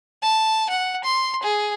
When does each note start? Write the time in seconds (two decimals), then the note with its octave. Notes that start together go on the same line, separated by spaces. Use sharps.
0.23 A5
0.70 F#5
1.04 C6
1.43 G#4